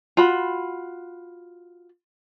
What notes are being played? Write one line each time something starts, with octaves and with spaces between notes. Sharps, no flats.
F4 F#4 B5